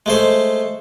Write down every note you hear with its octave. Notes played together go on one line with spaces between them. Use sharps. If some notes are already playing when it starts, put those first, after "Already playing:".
G#3 A3 C5